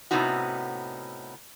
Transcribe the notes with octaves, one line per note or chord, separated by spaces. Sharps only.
A2 C3 B3 C#4 D#4 F#4